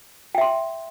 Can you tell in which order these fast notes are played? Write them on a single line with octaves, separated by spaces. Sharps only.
G5 E5 C6